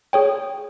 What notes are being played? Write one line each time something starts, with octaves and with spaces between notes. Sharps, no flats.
G#4 C#5 G5